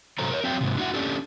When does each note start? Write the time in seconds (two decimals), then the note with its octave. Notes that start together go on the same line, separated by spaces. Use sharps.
0.18 G#2 C3 F#3 A4 C5 A#5
0.31 A#4 C#5
0.43 F#3 C4 E5 F5 G5
0.61 G#2 C3
0.77 D4 E4 F#4 G#4 E5 F#5
0.94 C#4 D4 G4 A4